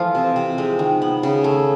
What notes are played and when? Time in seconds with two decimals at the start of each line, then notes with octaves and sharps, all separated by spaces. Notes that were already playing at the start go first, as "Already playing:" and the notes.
Already playing: E3 F3 A3 F4
0.15 C3
0.36 C3
0.58 G#3
0.79 D#3
1.02 B3
1.23 C#3
1.44 A3